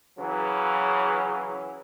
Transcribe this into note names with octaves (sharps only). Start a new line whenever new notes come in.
C#3 E3 F#3